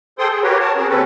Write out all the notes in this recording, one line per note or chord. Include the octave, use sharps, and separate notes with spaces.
G#4 A4 C5 G5 C6 D#6
G#4
F#4 G4 A#4 B4 C#5
A#4 C#5 A5
C4 C#4 G#4 A#4
D#2 C4 C#4 A4 B4